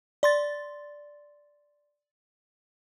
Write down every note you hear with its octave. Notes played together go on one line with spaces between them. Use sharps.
D5 C6 A6